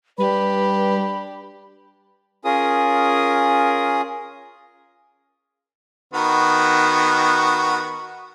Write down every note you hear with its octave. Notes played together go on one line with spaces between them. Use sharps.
G3 D4 G4 B4 B5
C#4 F4 G#4 A#4 D#6
D#3 B3 F#4